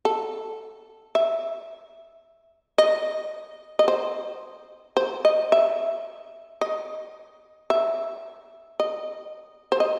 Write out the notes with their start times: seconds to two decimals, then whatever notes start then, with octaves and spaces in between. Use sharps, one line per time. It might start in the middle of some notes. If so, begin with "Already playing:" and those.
0.05 A4
1.15 E5
2.78 D#5
3.79 D#5
3.88 C5
4.97 C5
5.25 D#5
5.52 E5
6.61 D#5
7.70 E5
8.80 D#5
9.72 C5
9.80 D#5